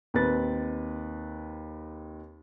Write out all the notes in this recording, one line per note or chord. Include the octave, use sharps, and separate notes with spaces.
D#2 C4 B4 A6